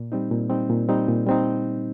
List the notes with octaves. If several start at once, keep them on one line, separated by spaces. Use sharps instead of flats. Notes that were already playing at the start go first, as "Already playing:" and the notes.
Already playing: A#2
G3 C4 D#4
A#2
G3 C4 D#4
A#2
G3 C4 D#4
A#2
G3 C4 D#4